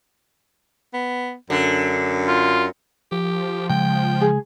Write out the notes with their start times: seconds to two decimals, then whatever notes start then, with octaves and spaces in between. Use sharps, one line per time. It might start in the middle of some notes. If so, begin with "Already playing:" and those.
0.94 B3
1.50 F#2 D3
2.28 F4
3.12 F3 G4
3.70 C#3 G#3 G5
4.21 G#4